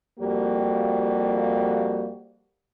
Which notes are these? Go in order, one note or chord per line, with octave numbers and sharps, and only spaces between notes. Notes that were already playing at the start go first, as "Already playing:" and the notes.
F2 G3 A#3 F#4 G4